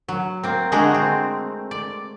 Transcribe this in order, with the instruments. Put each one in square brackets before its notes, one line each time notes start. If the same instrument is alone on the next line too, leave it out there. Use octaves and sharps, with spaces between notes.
[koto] F#3
A#3 C4
D3 G#3 A3 F#4 G#4 A#4
C4
D5